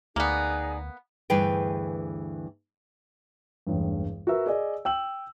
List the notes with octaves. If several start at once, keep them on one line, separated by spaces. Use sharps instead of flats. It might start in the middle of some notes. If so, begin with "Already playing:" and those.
D2 A#3 B3 D#4 G#4 D5
D2 G2 E3 G#4 B4 G5
E1 A1 G2
F#4 A#4 B4 E5 E6
G#4 D5 D#5 G#5
G5 E6 F#7